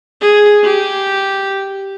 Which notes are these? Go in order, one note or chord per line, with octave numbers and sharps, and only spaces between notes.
G#4
G4